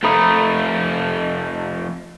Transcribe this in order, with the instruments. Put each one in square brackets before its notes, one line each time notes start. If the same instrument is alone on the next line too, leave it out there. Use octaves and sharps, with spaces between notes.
[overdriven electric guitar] F2 A3 [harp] A#4 B5 D#6